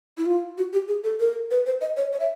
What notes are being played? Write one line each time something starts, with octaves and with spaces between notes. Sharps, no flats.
E4
F4
F#4
G4
G#4
A4
A#4
B4
C5
D#5
C#5
C#5
E5